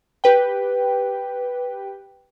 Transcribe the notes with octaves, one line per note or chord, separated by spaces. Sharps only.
G4 B4 G5